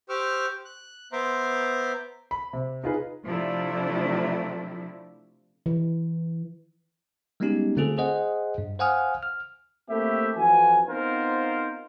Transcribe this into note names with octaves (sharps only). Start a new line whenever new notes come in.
G4 C5 C#6 D6 E6 F6
F#6
B3 C5 E5 A#5 C6 D6
B5
C3
D#4 F4 G#4 B4
C3 F3 A3 D4 E4
E3
G3 G#3 B3 C#4 D#4 G4
D3 A3 C4 F4 G#4 A4
G#4 C5 D#5 F#5
G2
C5 F5 F#5 G#5 D#6 F6
F6
A3 A#3 C4 E4 G4 E5
F2 E3 F#4 G#5
B3 C4 D#4 F4 A#4 C5